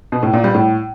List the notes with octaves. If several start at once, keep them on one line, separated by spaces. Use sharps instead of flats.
B2
A2
A#2
G3
A2